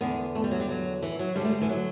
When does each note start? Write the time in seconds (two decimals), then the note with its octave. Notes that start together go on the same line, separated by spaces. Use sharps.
0.01 E2 D3 B3
0.35 A3
0.44 G3
0.51 F#3
0.60 G3
0.69 F#3
1.02 E3
1.19 F#3
1.35 D3 G3
1.40 D2
1.45 A3
1.52 G3
1.61 E3
1.69 F#3